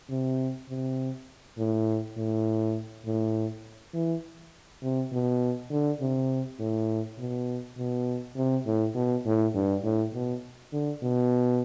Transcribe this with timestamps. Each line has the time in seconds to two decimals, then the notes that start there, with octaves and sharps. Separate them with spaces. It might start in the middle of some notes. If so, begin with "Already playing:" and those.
0.10 C3
0.69 C3
1.58 A2
2.17 A2
3.05 A2
3.94 E3
4.82 C3
5.12 B2
5.71 D3
6.00 C3
6.59 A2
7.18 B2
7.78 B2
8.36 C3
8.66 A2
8.95 B2
9.25 A2
9.54 G2
9.84 A2
10.14 B2
10.73 D3
11.02 B2